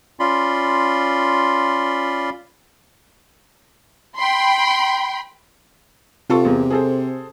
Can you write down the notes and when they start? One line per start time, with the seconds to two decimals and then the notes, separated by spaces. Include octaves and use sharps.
0.20 C#4 F4 D5 B5 C6
4.16 G5 B5 C6
6.30 C3 F4 A4 C#6
6.45 E2 A#3
6.70 G#4 A4 C5